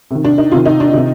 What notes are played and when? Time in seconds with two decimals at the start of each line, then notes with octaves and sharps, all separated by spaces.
0.11 C3 D#3
0.24 D4
0.38 D#4
0.52 C3 D#3 F4
0.66 D#4
0.80 D4
0.94 C3 D#3 D#4